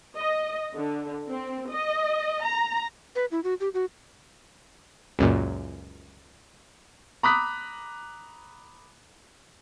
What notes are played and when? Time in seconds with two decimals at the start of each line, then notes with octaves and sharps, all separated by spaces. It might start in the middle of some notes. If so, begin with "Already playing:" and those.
0.17 D#5
0.74 D3
1.29 C4
1.70 D#5
2.44 A#5
3.15 B4
3.31 E4
3.44 F#4
3.60 G4
3.74 F#4
5.19 C#2 F#2 A#2
7.23 A#5 B5 D6 D#6 F#6 B6